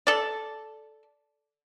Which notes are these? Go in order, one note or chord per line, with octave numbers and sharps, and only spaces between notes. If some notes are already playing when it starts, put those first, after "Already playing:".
A4 D5